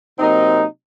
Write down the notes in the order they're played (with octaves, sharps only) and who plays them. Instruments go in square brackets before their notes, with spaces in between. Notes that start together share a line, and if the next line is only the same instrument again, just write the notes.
[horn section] C3 F#3 A#3 C4 D#4